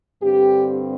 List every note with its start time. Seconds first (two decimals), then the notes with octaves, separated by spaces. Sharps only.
0.23 G2 D3 C4 G4